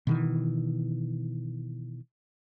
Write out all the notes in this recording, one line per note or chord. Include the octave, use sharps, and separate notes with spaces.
B2 D#3 E3